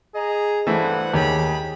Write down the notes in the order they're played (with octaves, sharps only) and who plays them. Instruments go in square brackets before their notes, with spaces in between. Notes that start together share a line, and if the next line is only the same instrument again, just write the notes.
[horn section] G#4 D#5 A#5
[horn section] G2 C5 F#5 [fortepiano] E3 A3
[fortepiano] D#2 [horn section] G#4 C#5 B5